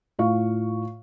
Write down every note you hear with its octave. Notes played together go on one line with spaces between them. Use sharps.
A2 F4 F5 C#6